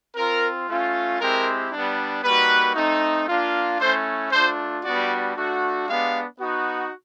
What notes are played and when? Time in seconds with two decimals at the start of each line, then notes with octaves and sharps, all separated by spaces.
0.16 C4 F4 A#4
0.69 A3 C#4 F4
1.20 G#3 C4 E4 G4 A#4
1.72 G3 B3 D4
2.24 G3 A#3 D#4 F#4 B4
2.76 A3 C4 D#4
3.28 A#3 D4 F4
3.81 A3 C#4 E4 C5
4.32 A3 D4 F4 C5
4.85 G3 B3 D4 F#4 D5
5.36 A3 D4 F#4
5.88 G#3 B3 D4 G4 F5
6.40 B3 D#4 F#4